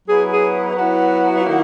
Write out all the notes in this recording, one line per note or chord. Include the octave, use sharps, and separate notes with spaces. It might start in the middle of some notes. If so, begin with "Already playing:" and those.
F#3 B3 E4 G#4
G#4
F#3 B3 E4 F#4
D#3 A#3 E4